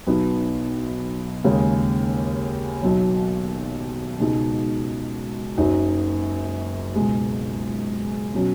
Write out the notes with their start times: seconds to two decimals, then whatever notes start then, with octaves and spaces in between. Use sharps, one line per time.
0.07 B1 B2 B3 D#4
1.44 D#2 C#3 G#3 C#4
2.82 B1 B2 F#3
4.20 C#2 B2 G#3 D#4
5.57 F#1 F#2 F#3 D#4
6.96 C#2 B2 G#3
8.34 B2 F#3 C#4